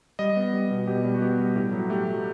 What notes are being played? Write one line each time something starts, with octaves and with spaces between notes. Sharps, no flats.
G3 D#5
B3
G3
B2
B2 G4
G3
F#4
B3 G4
G3
A2 G4
F#3
A3 G4
F#3